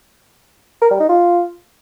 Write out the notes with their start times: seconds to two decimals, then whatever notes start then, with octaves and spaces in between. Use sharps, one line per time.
0.82 A#4
0.91 G3
1.00 D#4
1.09 F4